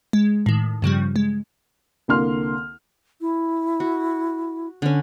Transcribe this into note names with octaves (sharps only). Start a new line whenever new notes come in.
G#3
A2 D#3
G2 C#3 F3 G3
G#3
C2 D3 A#3 C6 F6
E4
F#4
D3 C#4